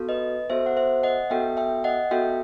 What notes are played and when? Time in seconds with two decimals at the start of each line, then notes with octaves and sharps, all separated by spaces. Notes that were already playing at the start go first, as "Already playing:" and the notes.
Already playing: B3 F#4 A4
0.09 B4 D#5
0.50 B3 F#4 A4 C5 E5
0.66 F#5
0.77 C5 E5
1.03 D#5 F#5
1.30 B3 F#4 A4 E5 G5
1.57 E5 G5
1.84 D#5 F#5
2.11 B3 F#4 A4 E5 G5